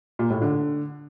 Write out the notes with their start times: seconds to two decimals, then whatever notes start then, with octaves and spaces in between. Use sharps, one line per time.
0.19 A#2
0.30 A2
0.42 D3